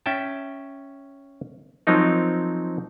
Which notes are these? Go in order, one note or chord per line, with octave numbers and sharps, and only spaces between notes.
C#4 E5 G5 A5
F3 F#3 C4 D#4 A#4